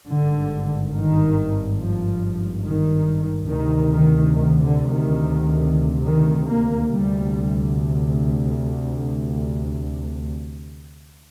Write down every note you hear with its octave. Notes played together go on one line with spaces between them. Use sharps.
G#1 G2 D3
D#3
F3
D#3
D2 C3 D#3
D#3
D#3
D3
D#3
D#3
A#3
D2 C3 G3